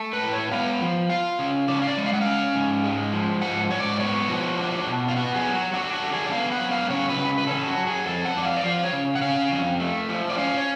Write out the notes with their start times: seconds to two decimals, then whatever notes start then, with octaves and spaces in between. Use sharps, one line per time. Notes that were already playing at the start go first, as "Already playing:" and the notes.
Already playing: A3
0.13 B4
0.23 A2
0.33 C#5
0.52 B3 F5
0.81 F3
1.09 F4 F5
1.39 C#3
1.68 C#4 D5
1.82 F5
1.87 D5
1.97 G#3
2.06 F5
2.13 F#5
2.21 C#4 F5
2.55 G#2
2.84 G#3
3.13 F3
3.42 G#2 F#5
3.70 G#2 C#5
3.80 D5
4.00 B3 C#5
4.28 F3 F#4
4.58 D4
4.87 B2
5.08 F4
5.16 B3 F#4
5.35 G#4
5.45 F#3
5.55 F#4
5.74 D4 F#4
5.93 F#4
6.03 D3
6.12 G#4
6.26 D5
6.31 B3 F5
6.52 F#5
6.61 F#3
6.71 F5
6.90 C#3 C#5
7.09 B4
7.19 C#3
7.38 B4
7.47 C#4 A4
7.67 F#4
7.77 F#3
7.87 G#4
8.06 F2 A4
8.25 F#5
8.35 F2 D5
8.45 F5
8.57 D5
8.64 F3 F5
8.84 C#5
8.93 C#3
9.15 F#5
9.22 C#4 F5
9.51 F2
9.80 A3
10.09 F3
10.30 D5
10.38 C#4 F5
10.57 C#5